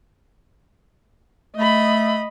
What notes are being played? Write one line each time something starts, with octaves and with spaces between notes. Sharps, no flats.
A3 D#5 B5